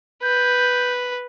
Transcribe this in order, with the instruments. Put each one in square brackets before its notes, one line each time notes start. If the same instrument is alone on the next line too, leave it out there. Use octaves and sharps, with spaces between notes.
[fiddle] B4 [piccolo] G6